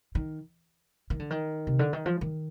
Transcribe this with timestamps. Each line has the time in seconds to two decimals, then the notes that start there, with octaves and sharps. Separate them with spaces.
0.15 D#3
1.10 D#3
1.19 D3
1.30 D#3
1.67 C3
1.79 D3
1.93 D#3
2.06 F3
2.21 D#3